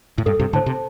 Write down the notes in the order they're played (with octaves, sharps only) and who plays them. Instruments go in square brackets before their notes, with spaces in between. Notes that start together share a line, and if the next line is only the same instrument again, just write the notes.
[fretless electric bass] A2
[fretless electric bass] G2 [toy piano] A4
[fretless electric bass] G2 C3
[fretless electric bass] A2 D3 [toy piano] C5 A5
[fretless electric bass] C3